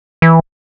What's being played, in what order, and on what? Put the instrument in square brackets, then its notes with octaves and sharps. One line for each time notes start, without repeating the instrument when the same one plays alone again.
[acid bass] E3